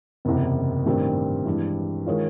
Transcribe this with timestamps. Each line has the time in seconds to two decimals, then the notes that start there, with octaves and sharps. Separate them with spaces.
0.25 F#1 E2 C3
0.86 A1 G2 D#3 G3 C4
1.46 G2 E3 G#3 C4
2.06 D#3 G#3 C#4 F4